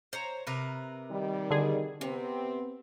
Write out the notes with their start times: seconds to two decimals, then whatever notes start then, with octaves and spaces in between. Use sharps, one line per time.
0.13 C5 C#5 A#5
0.47 C3 A#4 B4
1.10 D#3 G3
1.51 D3 G#4
2.01 C3 B3 C4